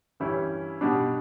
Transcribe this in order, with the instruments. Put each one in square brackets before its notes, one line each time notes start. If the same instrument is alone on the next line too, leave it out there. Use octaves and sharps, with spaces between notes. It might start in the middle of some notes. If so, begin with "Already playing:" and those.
[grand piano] G2 E3 G3 C#4 E4
B2 G3 D4